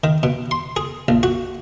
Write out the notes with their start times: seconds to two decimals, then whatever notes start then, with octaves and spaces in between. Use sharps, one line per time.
0.04 D#3
0.23 B2
0.51 C6
0.77 G#4
1.08 A#1
1.23 F#4